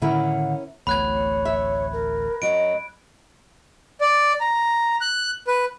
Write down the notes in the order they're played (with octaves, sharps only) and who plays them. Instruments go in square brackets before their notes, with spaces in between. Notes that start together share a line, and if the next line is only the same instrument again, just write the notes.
[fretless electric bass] A2 D3 D#3 [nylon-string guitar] C#4 E4 A#4 [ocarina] F#5
[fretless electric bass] D1 A1 A3 [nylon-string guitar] B3 [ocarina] C#5 [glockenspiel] B5 F#6 G#6
[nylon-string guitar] E5
[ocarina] A#4
[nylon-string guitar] F#2 F#3 [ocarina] D#5 [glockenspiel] D7
[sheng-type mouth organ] D5
A#5
F#6
B4